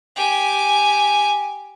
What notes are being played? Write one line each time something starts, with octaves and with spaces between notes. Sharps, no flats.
G4 G#5